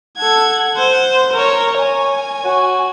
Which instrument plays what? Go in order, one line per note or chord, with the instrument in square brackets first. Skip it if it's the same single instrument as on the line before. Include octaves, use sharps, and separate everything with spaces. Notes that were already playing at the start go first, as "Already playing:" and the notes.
[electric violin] A4 G#6 [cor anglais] F#5
[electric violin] C5
A#4 C#5
[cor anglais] C#5 [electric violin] G#5
[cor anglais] F#4